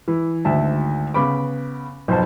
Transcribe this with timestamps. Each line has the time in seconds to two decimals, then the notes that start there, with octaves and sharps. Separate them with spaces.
0.08 E3
0.45 G#1 D2 E5 A5
1.14 C#3 B3 B5 D6
2.08 B1 F2 C5 A5